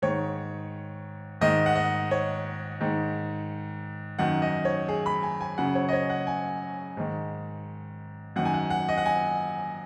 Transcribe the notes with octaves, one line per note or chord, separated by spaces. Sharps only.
G#2 D#3 C#5
G#2 D#3 D#5
F#5
D#5
C#5
G#2 D#3
F#2 D#3 F#5
D#5
C#5
G#4
B5
G#5
G#5
F#2 C#3 F#5
C#5
D#5
C#5
F#5
G#5
G#2 D#3
F#2 D#3 F#5
G#5
F#5
F#5
D#5
F#5
G#5